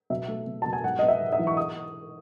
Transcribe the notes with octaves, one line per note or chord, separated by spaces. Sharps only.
B2 E5
A3
B2
B2 A5
G#5
G#2 F#5
B3 D#5
E5
G#2
E5
E3
C#6
D#6